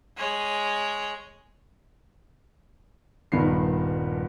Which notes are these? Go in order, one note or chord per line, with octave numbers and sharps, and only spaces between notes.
G#3 C#5
D#1 G2 D#3 B3 C7